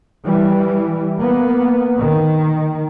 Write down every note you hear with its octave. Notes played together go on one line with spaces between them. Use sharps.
E3 G3
A#3 B3
D#3